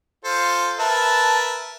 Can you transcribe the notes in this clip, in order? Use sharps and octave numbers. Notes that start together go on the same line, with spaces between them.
F4 A4 C5
A#4 B4 E5 A5